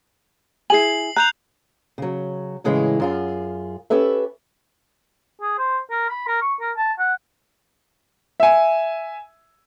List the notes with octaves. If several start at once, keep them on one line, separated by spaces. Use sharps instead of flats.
E4 G#4 G#5 C7 F#7
A#5 F#6 G6 F7
C#3 F#3
A2 C#3 E3 G#3 E4
F#2 F4 G#4
C#4 G4 A4 B4 E5
G#4
C5
A#4
B5
A#4
C#6
A#4
A5
F#5
E5 G#5